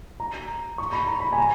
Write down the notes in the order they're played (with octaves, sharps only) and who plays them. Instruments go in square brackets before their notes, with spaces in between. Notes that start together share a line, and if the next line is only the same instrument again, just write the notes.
[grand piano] A#5
C#6
B5
A#5
B5
G#5
A#5